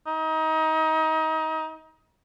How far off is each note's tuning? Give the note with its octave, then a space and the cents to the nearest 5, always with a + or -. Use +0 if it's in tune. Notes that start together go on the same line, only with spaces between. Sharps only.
D#4 +30